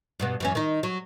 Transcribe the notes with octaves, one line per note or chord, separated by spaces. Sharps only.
G2 B2 B3
F#2 E3 C#4
D#3 D#4
F#3